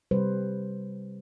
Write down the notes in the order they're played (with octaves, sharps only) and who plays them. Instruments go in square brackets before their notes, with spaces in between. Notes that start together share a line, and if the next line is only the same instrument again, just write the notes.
[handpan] C3 G3 B4 C5